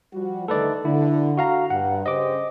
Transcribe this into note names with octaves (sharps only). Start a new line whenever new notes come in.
F3 G3 F#4
D3 D#3 A3 A4 B4 D5
D3 E4
F#4 F5 A#5
G2 F#5
C#3 G4 C5 D#5 D6